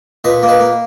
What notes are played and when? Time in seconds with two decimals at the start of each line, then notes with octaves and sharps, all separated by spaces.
0.24 A#2 B4 D#5
0.43 A#3
0.48 B4 D#5
0.60 A#3